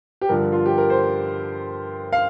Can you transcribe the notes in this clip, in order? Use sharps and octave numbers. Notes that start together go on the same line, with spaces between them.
G4
G2 D3 F3 A#4
F4
G4
A#4
C5
F5